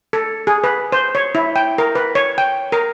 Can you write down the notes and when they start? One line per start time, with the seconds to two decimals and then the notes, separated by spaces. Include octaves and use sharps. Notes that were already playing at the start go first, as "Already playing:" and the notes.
0.13 A4
0.47 G#4
0.64 B4
0.92 C5
1.15 C#5
1.35 E4
1.56 G5
1.78 A#4
1.95 B4
2.15 C#5
2.38 G5
2.72 A#4